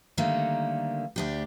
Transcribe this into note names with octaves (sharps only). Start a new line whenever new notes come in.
D3 D#3 G3 A3 A#3
D2 D4 G4